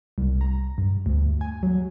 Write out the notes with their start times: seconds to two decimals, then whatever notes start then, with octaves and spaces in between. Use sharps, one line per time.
0.18 C2
0.41 A#5
0.78 G2
1.06 D2
1.41 G#5
1.63 F#3